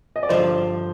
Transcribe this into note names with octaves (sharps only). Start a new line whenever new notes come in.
D#5
D5
G2 D3 F3 C5